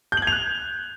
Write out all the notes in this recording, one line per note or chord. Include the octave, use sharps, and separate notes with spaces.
G6
F#7
G#6
F7
F#6